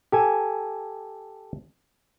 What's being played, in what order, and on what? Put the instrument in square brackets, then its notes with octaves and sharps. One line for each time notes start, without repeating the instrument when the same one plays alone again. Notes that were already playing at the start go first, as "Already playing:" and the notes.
[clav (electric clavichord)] G4 A4 G#5